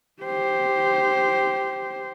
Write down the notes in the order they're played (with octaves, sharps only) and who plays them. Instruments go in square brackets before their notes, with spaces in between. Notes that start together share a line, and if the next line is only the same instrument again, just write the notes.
[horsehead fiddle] G4 C5